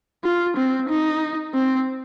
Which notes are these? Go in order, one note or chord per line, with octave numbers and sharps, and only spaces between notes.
F4
C4
D#4
C4